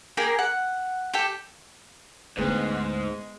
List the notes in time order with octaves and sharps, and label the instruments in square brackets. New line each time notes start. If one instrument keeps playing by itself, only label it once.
[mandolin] A#3 G4 G#4 A#4
F#5
G4 A4 G5
[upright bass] D2 D3 [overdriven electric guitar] G#2 [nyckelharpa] G#3 [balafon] B3 G#4 B4